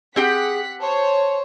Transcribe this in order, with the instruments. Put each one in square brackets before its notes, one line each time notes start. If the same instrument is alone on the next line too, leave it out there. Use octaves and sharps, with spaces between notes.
[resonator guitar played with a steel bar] C4 G4 G5 [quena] G#4 [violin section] F#5 B6
[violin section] C5 C#5 [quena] A5